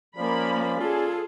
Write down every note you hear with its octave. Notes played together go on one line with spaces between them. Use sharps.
F3 A#3 C#4 D5 B5
F4 G#4 A4